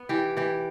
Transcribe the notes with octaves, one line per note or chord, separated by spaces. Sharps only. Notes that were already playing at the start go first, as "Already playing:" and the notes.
Already playing: B3
E3 G4
E3 G4